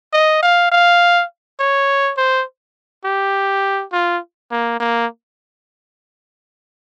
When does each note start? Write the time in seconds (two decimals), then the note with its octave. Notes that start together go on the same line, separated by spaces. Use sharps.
0.13 D#5
0.43 F5
0.72 F5
1.60 C#5
2.18 C5
3.05 G4
3.93 F4
4.51 A#3
4.80 A#3